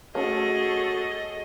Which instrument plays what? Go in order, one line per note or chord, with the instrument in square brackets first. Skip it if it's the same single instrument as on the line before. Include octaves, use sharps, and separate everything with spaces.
[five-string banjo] A3 C#4 [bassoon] F#4 [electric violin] G#4 A4 [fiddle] D#5